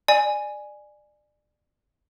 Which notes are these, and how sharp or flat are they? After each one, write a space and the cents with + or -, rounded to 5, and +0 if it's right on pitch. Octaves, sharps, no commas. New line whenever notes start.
D5 +25 G#5 +0